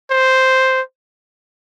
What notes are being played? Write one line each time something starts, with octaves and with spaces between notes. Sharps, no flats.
C5